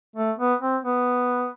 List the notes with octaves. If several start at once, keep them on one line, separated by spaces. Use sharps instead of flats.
A3
B3
C4
B3